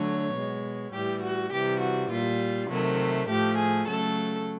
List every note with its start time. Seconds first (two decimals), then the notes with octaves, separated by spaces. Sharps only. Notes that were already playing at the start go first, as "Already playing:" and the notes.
Already playing: D3 F#3 A3 C#5
0.34 B2 G#3
0.93 A2 E3 G3 G4
1.23 F#4
1.52 C3 E3 G3 G4
1.81 F#4
2.11 A#2 G3 F4
2.70 C3 D#3 F#3 A3
3.29 A2 F3 A3 G4
3.58 G#4
3.88 C#3 F#3 A3 A4